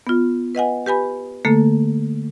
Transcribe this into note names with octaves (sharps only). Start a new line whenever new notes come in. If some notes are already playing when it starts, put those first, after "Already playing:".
B3 F4
B4 D#5 F#5 G#5
G4 B4 G#5 B5
D3 A3 A#3 A4